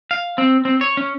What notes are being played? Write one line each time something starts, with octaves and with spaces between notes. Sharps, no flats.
F5
C4
C4
C#5
C#4